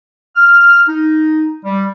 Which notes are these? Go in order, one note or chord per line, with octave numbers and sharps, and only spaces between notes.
F6
D#4
G3